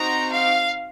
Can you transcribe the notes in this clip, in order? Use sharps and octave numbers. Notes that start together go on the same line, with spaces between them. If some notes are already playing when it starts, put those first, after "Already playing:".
Already playing: C4 D#4 F#4 A#5
F5